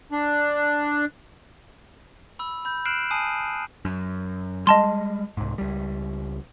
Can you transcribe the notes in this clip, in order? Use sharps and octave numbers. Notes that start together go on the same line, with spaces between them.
D4
B5 E6
B5 G6
F6 F#6 C7 D7 E7 F#7
G#5 A5 D#6 C7 D#7
F#2
G3 G#3 D#5 A5 C6
C2 G#2
C#2 G3